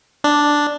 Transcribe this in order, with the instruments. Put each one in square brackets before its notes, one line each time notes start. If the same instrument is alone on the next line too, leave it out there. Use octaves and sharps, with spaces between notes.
[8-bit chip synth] D4